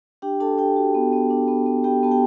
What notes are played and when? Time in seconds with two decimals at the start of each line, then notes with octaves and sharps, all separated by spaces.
0.22 D4 G4 G5
0.40 D4 A4 A5
0.58 D4 G4 G5
0.76 F#4
0.95 B3
1.13 B3
1.30 D4
1.48 B3
1.66 B3
1.84 B3 G4 G5
2.03 B3 A5
2.11 G4 G5